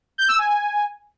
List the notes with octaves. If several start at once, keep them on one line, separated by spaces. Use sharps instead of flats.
G6
E6
G#5